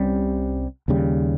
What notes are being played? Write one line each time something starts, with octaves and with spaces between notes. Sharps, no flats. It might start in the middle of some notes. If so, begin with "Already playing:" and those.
Already playing: C2 C3 G3 C#4
D#2 C#3 G3